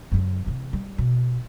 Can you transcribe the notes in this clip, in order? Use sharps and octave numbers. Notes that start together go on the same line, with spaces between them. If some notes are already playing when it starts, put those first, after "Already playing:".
F#2 C#3
C3 E3
G3
B2